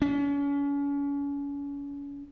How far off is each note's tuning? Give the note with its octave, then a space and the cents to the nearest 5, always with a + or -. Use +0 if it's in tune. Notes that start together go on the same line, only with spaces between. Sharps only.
C#4 +35